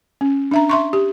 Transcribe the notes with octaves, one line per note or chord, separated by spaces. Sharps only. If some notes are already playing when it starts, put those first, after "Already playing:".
C#4
D4 E5 A#5
E5 C6 C#6
G4